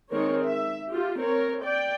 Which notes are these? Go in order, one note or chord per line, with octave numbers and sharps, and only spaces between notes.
D#3 G#3 C4 A#4 C#5
E5
F4 G4
C4 A#4 C#5
D5 G5